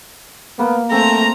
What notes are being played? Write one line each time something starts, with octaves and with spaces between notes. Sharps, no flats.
A#3 B3
A3 C4 A#5